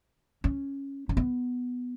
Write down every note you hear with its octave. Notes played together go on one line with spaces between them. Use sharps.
C#4
C#4
B3